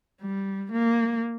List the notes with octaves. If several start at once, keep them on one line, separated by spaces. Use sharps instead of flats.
G3
A#3